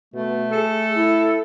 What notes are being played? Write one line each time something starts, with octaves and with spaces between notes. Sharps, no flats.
B2 A3
G#4 A4
E4